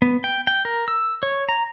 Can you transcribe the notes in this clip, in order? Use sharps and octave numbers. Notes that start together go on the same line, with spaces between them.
B3
G5
G5
A#4
E6
C#5
A#5